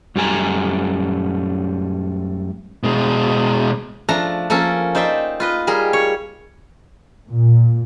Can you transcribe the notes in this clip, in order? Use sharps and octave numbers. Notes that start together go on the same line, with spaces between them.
F#2 G3 A3 G#5 A#5
B2 G#3
F3 A3 D4 A#5
F3 A#3 C#4 A4
D#4 C5 D5 E5 G5
F4 B4 D#5
G3 G#4 A#4
C#5
A#2